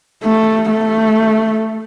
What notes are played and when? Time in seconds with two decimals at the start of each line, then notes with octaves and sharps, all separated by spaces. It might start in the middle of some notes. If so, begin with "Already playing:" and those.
0.24 A3
0.70 A3